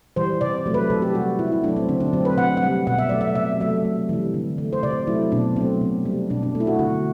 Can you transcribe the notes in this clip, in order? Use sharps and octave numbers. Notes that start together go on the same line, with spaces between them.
E3 G3 C5
C3 D5
F#3 A3
B4
C3 A4
G4
G3 F#4
C3 E4
E4
F#3 A3 D4
C4
D3 C4
D4
F#3 A3 C4
B4
C3 F#5
F#5
G3
B2 F#5
E5
F#3 A3 D5
E5
C3 E5
F#3 A3 E5
C3
E3 G3
D3
A3
C5
C3 D5
F#3 A3 E4
B2 D4
F#3 A3 C4
C3
G3
B2 D4
D4
A3
E4
F#4
D3 F#4